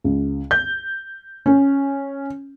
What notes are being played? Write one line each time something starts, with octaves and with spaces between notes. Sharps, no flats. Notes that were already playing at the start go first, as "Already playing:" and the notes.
C#2
G6
C#4